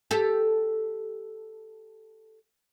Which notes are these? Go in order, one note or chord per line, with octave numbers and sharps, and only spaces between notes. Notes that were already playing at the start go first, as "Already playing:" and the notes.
G4 A4